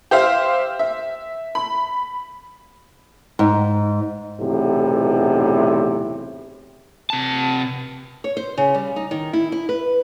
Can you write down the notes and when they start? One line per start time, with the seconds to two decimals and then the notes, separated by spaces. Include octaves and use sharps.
0.11 G4 C5 E5 F5
0.79 E5
1.55 B5
3.39 G#2
4.40 B1 E2 A2 C3
7.10 C3 A5
8.24 C#5
8.37 C5
8.57 C#3
8.75 G3
8.96 D#4
9.11 D#3
9.33 E4
9.52 E4
9.69 B4